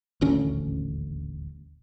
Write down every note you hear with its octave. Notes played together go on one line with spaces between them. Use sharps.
D#1 A1 D2 C#4